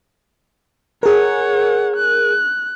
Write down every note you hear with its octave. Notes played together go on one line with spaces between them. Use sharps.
G#4 A#4 C#5 F#5
F#6